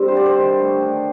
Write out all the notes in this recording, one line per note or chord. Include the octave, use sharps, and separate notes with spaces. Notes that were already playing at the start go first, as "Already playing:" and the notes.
Already playing: G2 G3 C4 G4
C5
D3 D5
C5
D#3
A3
D4